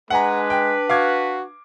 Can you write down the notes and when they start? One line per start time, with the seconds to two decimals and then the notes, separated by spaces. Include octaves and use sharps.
0.10 G#3 D4 B4 F#5 G#5 A#5
0.50 G5
0.89 F#4 F5 D6 G#6